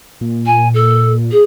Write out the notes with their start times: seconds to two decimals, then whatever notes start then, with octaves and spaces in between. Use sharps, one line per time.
0.21 A#2
0.45 G#5
0.73 A4
1.31 G#4